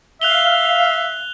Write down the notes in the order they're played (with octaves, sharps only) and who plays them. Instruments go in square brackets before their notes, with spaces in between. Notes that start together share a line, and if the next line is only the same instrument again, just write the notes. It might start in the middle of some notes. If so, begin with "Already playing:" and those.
[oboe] E5 [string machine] F5 [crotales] F#6 F7 G7